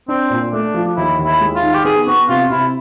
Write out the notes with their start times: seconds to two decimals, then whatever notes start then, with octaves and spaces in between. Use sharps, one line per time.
0.08 C4 D4
0.30 A#2
0.53 A3 D4
0.74 F3
0.97 D#2 E4
1.19 D#2
1.26 E4
1.41 G#3
1.56 F4
1.63 D#3
1.74 G4
1.85 B3 G#4
2.07 B3 F#4
2.29 C3 F4
2.50 C3 E4